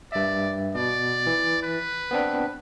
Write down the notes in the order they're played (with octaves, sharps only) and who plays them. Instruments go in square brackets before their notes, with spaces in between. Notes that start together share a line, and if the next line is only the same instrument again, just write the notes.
[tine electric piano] G2 E5 [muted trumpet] D5
[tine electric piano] B2 [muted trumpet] D5
[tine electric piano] E3
[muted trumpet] B4
[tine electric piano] B3 C4 D4